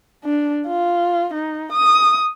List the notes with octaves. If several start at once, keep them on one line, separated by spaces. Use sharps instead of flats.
D4
F4
D#4
D#6